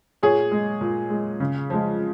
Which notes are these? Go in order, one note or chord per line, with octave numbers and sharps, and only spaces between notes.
A#2 G#4 C#5
G#3
A#2
G#3
C#3
F3 G#3